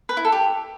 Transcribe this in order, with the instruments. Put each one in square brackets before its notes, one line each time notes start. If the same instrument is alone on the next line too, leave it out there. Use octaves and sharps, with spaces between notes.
[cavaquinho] B4
E4
A4
G4